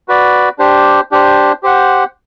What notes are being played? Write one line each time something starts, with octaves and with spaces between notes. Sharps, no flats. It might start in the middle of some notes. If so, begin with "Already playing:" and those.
F#4 B4 D5
D4 G4 C5
D4 G4 C5
G4 C5 F#5